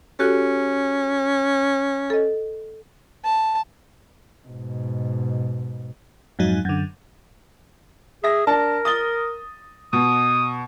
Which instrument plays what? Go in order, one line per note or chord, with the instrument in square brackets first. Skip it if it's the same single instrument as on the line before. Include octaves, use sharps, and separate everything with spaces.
[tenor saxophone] C#4 [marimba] F#4 G4 A4
[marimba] A4 D#5
[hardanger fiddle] A5
[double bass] G#2 B2
[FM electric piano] F2 G#2 F#3 D#4
F#2 D3
[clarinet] G#4 [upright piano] E5 A#6
[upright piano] D4 A5 [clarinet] A#4
[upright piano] D#6 A6 G7
[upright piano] B2 [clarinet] D#6